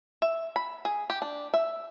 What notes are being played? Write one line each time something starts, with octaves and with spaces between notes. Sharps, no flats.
E5
B5
G#4
G4
D4
E5